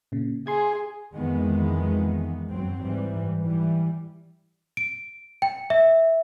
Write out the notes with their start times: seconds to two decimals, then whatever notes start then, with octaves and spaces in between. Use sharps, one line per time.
0.12 A#2 C#3
0.47 G#4 C6 G#6
1.14 F2 D#3 E3 G#3 B3
2.48 F#2 F#3 C4
2.83 G#2 E3 G3
3.43 E3 G3
4.77 D7
5.42 G5
5.70 E5